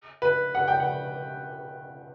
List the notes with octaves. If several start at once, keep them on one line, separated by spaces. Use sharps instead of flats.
B4
F#5
G5
F#5